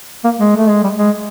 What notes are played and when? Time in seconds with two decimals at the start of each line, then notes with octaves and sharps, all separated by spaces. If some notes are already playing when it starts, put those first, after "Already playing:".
0.24 A#3
0.39 G#3
0.57 A3
0.69 G#3
0.83 G3
0.97 G#3